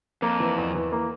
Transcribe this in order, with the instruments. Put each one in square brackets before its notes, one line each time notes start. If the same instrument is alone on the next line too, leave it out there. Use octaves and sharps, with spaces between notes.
[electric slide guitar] F2 [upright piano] A#3
[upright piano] E3
E2
E3
A#3